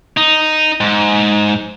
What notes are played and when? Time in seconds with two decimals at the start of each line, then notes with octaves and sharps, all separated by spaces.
0.17 D#4
0.81 G#2